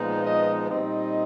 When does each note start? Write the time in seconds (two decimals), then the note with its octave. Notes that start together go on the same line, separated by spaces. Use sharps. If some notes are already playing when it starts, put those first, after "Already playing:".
Already playing: A#2 F3 G#3 B3 D#4
0.25 D#5
0.70 A#2 G3 C4 D#4 D#5